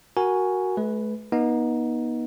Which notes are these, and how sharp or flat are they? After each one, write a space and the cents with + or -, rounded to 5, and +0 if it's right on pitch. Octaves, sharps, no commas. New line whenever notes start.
F#4 +5 A#4 +5 G#5 +0
A3 -45 B4 +0
B3 -35 D#4 +10